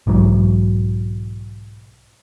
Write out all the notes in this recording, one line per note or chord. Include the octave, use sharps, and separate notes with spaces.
B1 G#2 E3 F#3